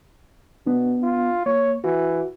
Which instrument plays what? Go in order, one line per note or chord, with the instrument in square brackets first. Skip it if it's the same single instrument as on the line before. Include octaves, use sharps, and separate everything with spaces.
[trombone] B2 [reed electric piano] B3 D4
[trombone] F4
[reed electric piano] A#3 [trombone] C#5
[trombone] E3 [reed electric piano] F#4